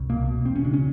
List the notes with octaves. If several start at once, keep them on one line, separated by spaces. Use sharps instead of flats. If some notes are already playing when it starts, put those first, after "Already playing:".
Already playing: C2
B2 A#3
B2
E1 C4
C#4
C#3 D4
C#4